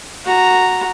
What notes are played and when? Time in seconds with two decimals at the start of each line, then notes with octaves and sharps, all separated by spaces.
0.25 F#4 A#5